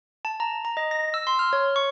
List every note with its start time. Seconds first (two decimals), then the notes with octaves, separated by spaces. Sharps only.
0.25 A5
0.40 A#5
0.65 A#5
0.77 D#5
0.91 A#6
1.14 E6
1.27 C6
1.39 F6
1.53 C#5
1.76 C#6